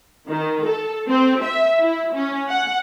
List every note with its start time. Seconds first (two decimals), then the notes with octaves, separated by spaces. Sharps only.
0.28 D#3
0.65 A4
1.09 C4
1.42 E5
1.81 E4
2.14 C#4
2.49 F#5